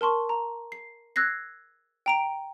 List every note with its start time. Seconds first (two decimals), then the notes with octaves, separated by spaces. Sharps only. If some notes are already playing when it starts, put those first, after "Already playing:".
0.01 A#4 A5 C6 C#6
0.29 A#5
0.72 C7
1.16 E6 F#6 G#6 A#6 C7
2.06 G5 A#5 D7